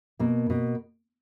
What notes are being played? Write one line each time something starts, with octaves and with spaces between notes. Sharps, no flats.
B2 A#3
B2